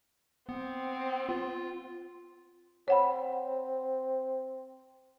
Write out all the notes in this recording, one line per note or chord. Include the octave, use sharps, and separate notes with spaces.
B3 C4
F4
C4 C#5 F#5 B5